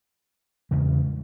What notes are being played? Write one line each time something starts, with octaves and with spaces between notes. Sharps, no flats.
E2 C#3 G#3